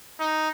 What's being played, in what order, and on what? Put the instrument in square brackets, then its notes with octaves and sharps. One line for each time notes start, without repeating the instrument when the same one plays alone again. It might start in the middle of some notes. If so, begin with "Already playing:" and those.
[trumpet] D#4